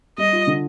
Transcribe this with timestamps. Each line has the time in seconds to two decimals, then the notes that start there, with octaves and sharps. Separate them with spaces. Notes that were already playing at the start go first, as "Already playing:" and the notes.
0.18 G3 D#5
0.33 F4
0.47 D3